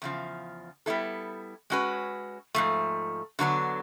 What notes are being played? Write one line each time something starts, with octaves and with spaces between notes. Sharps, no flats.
E2 C#3 F3
G3 B3 E4 A4
G#3 C#4 F#4 B4
G#2 F3 A3
D3 F#3 B3 D4